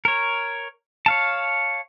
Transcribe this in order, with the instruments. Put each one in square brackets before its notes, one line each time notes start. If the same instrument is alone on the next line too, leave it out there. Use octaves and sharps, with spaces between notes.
[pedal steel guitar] A#4 C#5
C#5 F5 A5